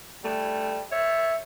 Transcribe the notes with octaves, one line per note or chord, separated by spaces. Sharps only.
G3 A3
C#5 E5